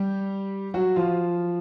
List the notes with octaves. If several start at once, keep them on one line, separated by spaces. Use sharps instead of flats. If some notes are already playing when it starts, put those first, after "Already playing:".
Already playing: G3 G4
F#3 F#4
F3 F4